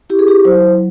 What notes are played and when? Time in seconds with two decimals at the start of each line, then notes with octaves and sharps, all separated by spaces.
0.10 E4 G4
0.19 G#4
0.28 G4
0.45 F#3 C5